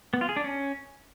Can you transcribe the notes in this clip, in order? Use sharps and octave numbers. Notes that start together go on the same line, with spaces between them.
B3
F4
G#4
D4
C#4